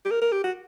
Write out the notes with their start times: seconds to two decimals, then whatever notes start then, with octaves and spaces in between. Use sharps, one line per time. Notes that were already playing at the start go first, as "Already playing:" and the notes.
0.05 G4
0.11 A#4
0.22 A#4
0.32 G4
0.44 F#4